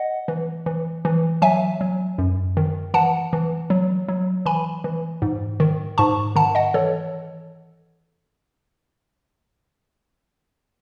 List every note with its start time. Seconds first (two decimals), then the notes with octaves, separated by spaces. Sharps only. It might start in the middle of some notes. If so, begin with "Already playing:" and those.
Already playing: D#5 F#5
0.28 E3
0.66 E3
1.05 E3
1.42 F#3 E5 G#5
1.81 F#3
2.18 F#2
2.57 D#3
2.94 E3 F#5 A5
3.33 E3
3.70 F#3
4.08 F#3
4.46 E3 G#5 B5
4.84 E3
5.22 G#2
5.60 D#3
5.98 G#2 A5 C#6
6.36 D#3 F#5 A5
6.55 D#5 F#5
6.74 E3 A4 C#5